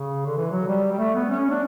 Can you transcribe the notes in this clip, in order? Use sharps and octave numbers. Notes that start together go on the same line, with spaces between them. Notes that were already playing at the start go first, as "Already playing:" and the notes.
Already playing: C#3
D3
E3
F#3
G3
G3
A3
B3
C#4
D4